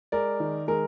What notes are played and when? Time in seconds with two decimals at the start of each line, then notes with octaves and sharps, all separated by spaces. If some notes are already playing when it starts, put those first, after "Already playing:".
0.12 G#3 A#4 D5
0.40 D#3
0.68 G#3 A#4